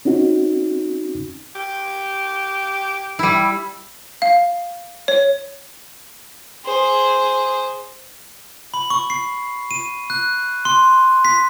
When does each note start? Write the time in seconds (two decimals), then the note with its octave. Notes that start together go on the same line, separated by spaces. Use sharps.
0.05 C4 C#4 D#4 F#4
1.55 G4
3.19 G3 E4
4.22 F5
5.08 C#5
6.65 G#4 C5
8.74 B5
8.90 C#6
9.10 C7
9.71 D#7
10.10 F#6
10.65 C6
11.25 B6